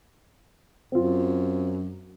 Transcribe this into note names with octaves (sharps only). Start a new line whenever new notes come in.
F#2 C4 F4